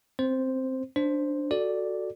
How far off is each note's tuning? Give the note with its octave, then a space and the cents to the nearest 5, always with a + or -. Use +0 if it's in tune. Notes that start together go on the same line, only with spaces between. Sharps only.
C4 +0 C5 +0
D4 +0 C5 +5
F#4 +0 A4 +0 D5 +0